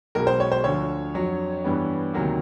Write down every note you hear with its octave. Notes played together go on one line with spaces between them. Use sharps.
B1 B2 G#3 A#4
C5
C#5
C5
D2 D3 F3 C#5
F2 D3 F#3
G2 E3 G3 B3
D2 C3 D#3 F#3 A#3